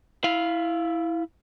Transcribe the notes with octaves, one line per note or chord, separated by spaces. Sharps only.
E4 F5